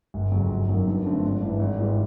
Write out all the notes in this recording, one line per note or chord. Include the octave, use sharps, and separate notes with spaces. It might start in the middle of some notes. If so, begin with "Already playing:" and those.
G1
F2 C#3 F#3
G1
F#2 D#3 F#3
G2
D3 F3 A3 C4
G#1
G2 E3
G#1
G#2 E3 G3